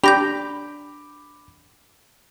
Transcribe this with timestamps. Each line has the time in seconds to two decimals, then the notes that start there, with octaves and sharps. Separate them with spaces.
0.04 D4 G4 B5 D6 G6 A#6 F7